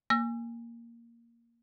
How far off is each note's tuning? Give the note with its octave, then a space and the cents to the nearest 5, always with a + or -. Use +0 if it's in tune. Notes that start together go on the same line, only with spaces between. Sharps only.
A#3 +0 E6 +35